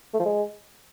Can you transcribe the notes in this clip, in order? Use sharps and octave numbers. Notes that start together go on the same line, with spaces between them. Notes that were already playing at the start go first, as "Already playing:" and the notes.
A3
F3
G#3